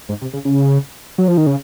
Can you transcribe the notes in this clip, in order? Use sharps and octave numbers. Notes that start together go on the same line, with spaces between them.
G#2
C3
C#3
C#3
F#3
F3
D#3
C#3